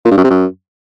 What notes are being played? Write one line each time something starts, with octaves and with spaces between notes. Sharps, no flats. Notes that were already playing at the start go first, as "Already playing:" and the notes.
A#2
G2
F#2
C3
F#2